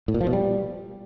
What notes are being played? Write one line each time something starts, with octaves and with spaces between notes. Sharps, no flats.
A2
A#2
F3
B2
G3